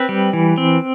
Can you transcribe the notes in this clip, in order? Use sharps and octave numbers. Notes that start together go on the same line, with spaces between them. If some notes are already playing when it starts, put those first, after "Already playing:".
Already playing: C4 B4
G3
E3
C4